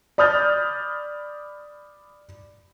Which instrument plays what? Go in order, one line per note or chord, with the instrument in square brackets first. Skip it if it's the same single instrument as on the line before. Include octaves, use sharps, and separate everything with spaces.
[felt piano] D5 B5 D#6 F6 G6 A6